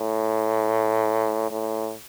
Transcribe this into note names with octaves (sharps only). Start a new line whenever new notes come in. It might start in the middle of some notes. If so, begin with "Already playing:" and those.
Already playing: A2
A2